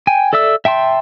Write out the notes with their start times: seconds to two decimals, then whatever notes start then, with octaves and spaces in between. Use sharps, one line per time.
0.07 G5 G#5
0.33 A4 D5 E5 E6
0.65 E5 G5 A5 C6